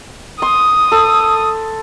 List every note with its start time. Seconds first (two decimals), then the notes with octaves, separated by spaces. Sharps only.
0.42 C6 D#6
0.92 A4